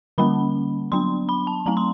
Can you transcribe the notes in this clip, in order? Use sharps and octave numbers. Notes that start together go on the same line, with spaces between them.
D3 G3 A#3 C#4 B5
F#3 B3 D4 C6
B5
A5
F#3 A3 C4 A#5
C6